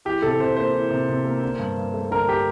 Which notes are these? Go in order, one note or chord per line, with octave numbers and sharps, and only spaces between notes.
E3 G4
C3 A4
C3 C5
A#3 C5
E3
C3
C3
A#3
D3
G2
G2
A3
D3 A#4
G4